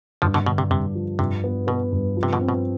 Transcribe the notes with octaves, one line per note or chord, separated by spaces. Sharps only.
G2 D3 F3
B2 D3
B2 D3
C3
G2 C3
F3
G2 C3
B3
B2 B3
G2
F3
C3
B2 D3
C4
B2